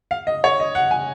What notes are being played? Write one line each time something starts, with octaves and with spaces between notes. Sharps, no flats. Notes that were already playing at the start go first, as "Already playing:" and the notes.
F5
D#5
C#5
D#5
F#5
G#5